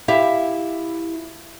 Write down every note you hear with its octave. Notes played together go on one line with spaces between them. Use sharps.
E4 G4 E5 F5